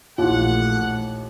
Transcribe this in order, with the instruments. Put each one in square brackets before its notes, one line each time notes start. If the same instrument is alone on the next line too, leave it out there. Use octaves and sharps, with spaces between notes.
[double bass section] A#1 A3 [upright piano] D#2 E3 [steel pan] F4 [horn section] F#5